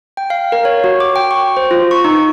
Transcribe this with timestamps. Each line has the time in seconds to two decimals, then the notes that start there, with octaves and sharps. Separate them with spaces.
0.17 G5
0.30 F5
0.52 A#4
0.65 C#5
0.84 F#4
1.00 D6
1.16 G5
1.31 C#6
1.57 C5
1.71 F4
1.91 C#6
2.04 D#4